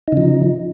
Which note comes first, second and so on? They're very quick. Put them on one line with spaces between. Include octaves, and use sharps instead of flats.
D#4 C#3 F3